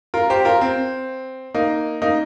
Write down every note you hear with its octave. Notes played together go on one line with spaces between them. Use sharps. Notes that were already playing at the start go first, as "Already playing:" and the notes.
F4 A#4
G4 C5
F4 A#4
C4
A#3 D#4
A#3 D#4